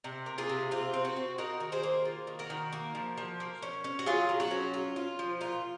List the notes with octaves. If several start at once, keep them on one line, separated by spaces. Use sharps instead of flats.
C3
A#3
F4 G#4
C3
C4 F4
C4
F#4
C4
D#4 F#4 A#4
D#3
G#4 C5
A#3
F4
D#3
F#4 A#4
D#3
A#3
F3
F3
A#3
C#4
C#4
F#4
F#3 F4 G#4
F#3
F#4
C#4
F4
F4
F3
A#2 F4